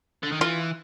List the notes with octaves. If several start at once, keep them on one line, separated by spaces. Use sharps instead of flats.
D3
D#3
E3 F4